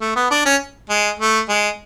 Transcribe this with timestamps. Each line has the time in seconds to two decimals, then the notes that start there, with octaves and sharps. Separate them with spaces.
0.01 A3
0.16 B3
0.31 D4
0.45 C#4
0.89 G#3
1.19 A3
1.49 G#3